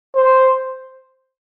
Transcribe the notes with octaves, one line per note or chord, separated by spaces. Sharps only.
C5